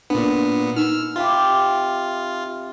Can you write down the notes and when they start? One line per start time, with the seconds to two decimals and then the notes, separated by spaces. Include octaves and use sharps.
0.10 A#2 B3 D4
0.76 D#4 E6 F6
1.16 C3 F4 B5 D6